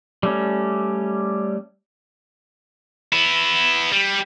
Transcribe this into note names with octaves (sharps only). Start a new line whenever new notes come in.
G3 A3 C#4
B3 E4
G3